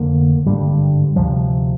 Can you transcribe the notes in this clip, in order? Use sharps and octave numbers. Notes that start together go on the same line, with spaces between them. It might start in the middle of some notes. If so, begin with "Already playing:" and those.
Already playing: F1 D3 A#3
G#1 G2 D3 G3
D2 C3 F3